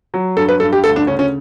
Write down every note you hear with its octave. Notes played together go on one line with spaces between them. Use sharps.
F#3
G2 A4
B4
G2 A4
G4
D2 A4
D4
C#3 C#4
C#4